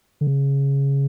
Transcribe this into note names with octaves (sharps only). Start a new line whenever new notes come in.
D3
C#3